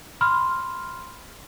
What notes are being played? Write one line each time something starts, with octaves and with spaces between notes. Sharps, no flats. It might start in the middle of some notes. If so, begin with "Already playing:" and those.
B5 C6 F6